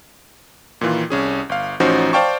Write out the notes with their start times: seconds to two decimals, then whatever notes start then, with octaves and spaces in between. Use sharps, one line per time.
0.81 A#2 D#3 E3 F4
1.10 C2 C#4 G#4
1.49 G1 F5
1.80 A1 F3 C#4 D#4 F#4 C5
2.13 C5 D5 F5 G5 A5 C#6